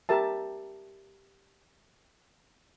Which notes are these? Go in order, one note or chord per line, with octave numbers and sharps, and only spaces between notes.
G4 A#4 E5 A5